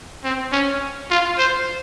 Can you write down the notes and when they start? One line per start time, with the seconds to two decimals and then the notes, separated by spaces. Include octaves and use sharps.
0.24 C4
0.52 C#4
1.10 F4
1.38 C5